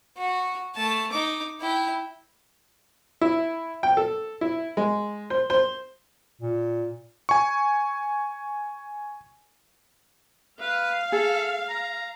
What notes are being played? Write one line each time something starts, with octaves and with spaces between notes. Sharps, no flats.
F#4
A3 A5
D#4 D6
E4 G5
E4
G5
A4
E4
G#3
C5
C5
A#2
G#5 C#6
B4 F5
G#4 A4
A#5